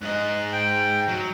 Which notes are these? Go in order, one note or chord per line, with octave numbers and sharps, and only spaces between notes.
G#2 D#5 F#6
G5
F#3